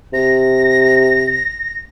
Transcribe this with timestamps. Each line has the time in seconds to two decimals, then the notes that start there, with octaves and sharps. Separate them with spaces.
0.13 C3 A#6